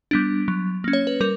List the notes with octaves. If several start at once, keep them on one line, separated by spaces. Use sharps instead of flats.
G3 B3 D4
F#3
A#3 C#4
C#5
B4
G3 A#4